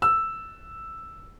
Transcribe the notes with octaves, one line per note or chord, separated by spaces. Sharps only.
E6